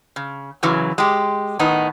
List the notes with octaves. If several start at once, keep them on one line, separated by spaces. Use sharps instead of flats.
C#3
F#2 C#3 E3 F#3
G#3 G4
A2 D#3 B3 D#4